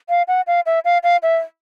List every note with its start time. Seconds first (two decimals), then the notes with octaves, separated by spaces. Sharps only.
0.09 F5
0.28 F#5
0.47 F5
0.66 E5
0.85 F5
1.03 F5
1.23 E5